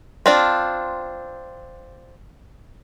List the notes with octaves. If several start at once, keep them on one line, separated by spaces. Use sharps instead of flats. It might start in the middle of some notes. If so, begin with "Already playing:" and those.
C4 D4 F4